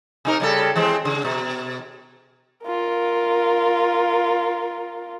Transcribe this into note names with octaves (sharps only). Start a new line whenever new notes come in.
C3 D#4 A#4
C#3 G3 A4
E3 G#3 C4
C#3
B2
F4 A#4